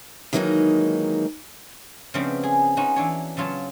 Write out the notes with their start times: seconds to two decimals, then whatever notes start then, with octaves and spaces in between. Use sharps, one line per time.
0.33 D#3 E3 F#3 G#3 A#3 D#4
2.14 C#3 F3 A3 B3 C4 D4
2.43 G#4
2.77 C#4 D#4 F4 F#4 B4
2.96 E3 D4 C#5
3.37 C#3 F#3 F4 C#5 A5